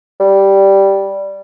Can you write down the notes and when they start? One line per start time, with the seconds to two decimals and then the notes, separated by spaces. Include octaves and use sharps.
0.20 G3